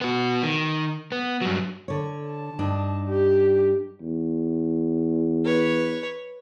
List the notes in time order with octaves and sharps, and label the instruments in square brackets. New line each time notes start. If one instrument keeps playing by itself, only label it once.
[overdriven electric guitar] B3 F#4
D#3
B3
G2 F#3
[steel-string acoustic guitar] D3 C#5
[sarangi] A5
[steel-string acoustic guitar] G2 D4 D#4
[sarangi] G4
[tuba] E2
[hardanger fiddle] B4 C#5